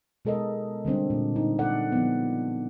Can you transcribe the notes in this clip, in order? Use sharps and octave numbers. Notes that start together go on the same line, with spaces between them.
B2 G#3 A4 A#4 D#5
D3 G3 C4 D4
A#2
D#4
A4 D5 F#5
F3 B3